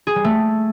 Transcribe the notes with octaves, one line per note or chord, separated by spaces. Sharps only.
G#4
G3
A3